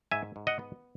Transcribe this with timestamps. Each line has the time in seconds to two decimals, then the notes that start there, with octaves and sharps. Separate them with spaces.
0.11 G#2 E5 G#5
0.36 G#2
0.47 D#5 F#5
0.59 B3